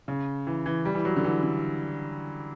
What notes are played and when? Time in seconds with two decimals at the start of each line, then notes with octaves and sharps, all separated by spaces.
0.08 C#3
0.47 E3
0.66 E3
0.85 G3
0.95 E3
1.05 F#3
1.16 D3
1.24 E3
1.43 D3